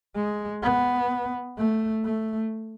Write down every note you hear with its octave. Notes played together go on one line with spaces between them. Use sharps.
G#3
B3
A3
A3